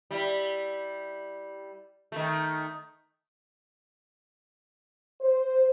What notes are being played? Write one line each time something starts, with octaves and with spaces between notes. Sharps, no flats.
G3 E4
D#3 A3
C5